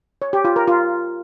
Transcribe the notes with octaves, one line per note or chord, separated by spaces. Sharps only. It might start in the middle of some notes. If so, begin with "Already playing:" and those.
C#5
G4
F4
A#4
F4